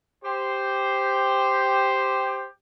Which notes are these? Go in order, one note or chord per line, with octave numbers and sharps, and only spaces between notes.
G4 C5